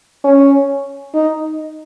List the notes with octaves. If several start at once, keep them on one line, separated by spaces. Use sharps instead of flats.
C#4
D#4